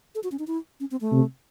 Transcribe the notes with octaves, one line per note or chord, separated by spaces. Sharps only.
A4
F#4
C#4
D#4
E4
C#4
C4
A3
C3